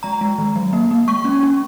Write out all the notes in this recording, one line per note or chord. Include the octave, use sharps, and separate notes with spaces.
G#3 A#5
G#3
D#3
F#3
A#3
A#3
G#3 C#6
C#4
C#4